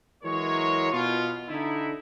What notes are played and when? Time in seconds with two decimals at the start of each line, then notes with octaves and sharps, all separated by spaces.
0.24 E3 F#3 G#3 A#4 C#5
0.92 B2 F4
1.48 D3 D#4 E4